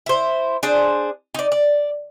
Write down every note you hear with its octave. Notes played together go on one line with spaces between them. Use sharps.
E4 C5
D4 G#4 C5
D#4 D5
D5